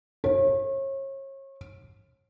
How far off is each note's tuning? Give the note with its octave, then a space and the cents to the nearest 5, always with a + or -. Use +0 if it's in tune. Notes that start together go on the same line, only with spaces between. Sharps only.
C#5 -35